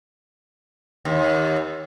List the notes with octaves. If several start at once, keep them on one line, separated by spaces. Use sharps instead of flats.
D#2